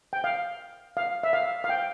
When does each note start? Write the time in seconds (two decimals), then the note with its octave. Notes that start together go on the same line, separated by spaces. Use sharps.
0.13 G5
0.24 F5
0.97 F5
1.23 E5
1.33 F5
1.64 F5
1.69 G5